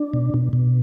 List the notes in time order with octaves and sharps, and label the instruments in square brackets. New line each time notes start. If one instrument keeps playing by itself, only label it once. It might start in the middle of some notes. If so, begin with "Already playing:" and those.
Already playing: [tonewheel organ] D4
B2
B2
B2